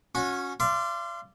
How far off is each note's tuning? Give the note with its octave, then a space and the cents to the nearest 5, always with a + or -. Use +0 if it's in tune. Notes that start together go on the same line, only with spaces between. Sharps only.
C#4 +0 F#4 -30
D5 +0 F5 -40 C6 -10